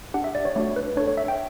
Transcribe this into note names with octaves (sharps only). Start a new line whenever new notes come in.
D4 G4 F#5
E5
D5
C#5
A3 D4 F#4 C#5
B4
D4 A4 C#5
C#5
E5
G5